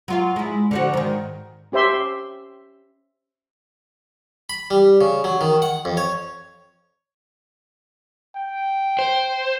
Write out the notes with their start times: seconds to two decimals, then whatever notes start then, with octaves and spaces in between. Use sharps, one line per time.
0.08 F#3 F4 F5
0.36 G#3 E4
0.71 D3 F3 F#4
0.93 G#2 D#3
1.72 C#4 G4 C5 E5 C6
4.50 B5
4.71 G3
5.01 C#3
5.24 F#3
5.41 D#3
5.62 F#5
5.85 F2
5.97 C#5
8.35 G5
8.99 C5